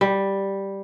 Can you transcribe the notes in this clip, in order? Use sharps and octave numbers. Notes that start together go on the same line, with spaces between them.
G3